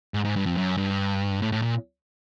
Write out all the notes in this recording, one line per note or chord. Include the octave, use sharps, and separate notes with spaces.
G#2
G#2
G2
F2
F#2
G2
A2
A2
A#2